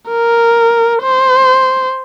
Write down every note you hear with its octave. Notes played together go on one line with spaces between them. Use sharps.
A#4
C5